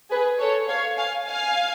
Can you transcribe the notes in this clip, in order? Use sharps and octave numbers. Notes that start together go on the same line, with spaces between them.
G#4 B4
A4 C#5
C#5 F5
F5 G#5
F5 G#5